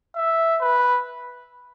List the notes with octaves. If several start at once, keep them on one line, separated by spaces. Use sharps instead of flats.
E5
B4